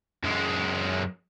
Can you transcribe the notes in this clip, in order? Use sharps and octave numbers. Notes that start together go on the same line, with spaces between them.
F#2 G#3